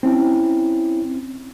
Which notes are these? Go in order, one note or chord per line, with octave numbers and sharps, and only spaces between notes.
C4 C#4 E4